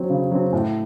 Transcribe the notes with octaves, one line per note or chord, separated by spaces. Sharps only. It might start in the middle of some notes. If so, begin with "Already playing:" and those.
Already playing: F#3 C4
C#3
F#3 C4
A2